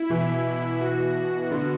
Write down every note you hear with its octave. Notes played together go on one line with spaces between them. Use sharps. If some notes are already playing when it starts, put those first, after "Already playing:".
Already playing: E4
B2 E3
B2
F#4
F#4
D3 B3